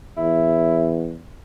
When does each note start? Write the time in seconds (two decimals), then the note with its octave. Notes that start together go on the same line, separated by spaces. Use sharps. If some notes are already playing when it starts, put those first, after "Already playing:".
0.17 E2 E4